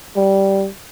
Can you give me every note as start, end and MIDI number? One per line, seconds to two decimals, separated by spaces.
0.16 0.67 55